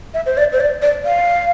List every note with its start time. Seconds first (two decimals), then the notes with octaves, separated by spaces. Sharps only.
0.14 E5
0.26 C5
0.37 D5
0.52 C5
0.60 D5
0.82 D5
1.06 F5